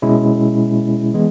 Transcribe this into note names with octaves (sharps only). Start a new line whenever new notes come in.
B2 G#3 C#4 E4
E3 G#3 B3